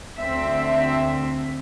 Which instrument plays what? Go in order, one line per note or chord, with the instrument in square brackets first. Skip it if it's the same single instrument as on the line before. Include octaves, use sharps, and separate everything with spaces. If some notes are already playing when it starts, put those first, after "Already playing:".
[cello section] D2 D3 C4 E5